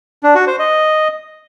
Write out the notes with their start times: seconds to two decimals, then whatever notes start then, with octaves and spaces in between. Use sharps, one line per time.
0.23 D4
0.35 F#4
0.47 C5
0.59 D#5